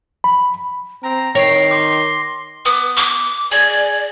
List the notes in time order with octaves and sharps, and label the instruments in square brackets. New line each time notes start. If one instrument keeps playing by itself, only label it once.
[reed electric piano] B5
[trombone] C4 [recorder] A#5
[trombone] D#3 [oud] C#5 [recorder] G5 [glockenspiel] A#6 C7
[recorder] C6 [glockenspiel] D6
[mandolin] B3 [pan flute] D6
[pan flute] D6
[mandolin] G#4 [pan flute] D5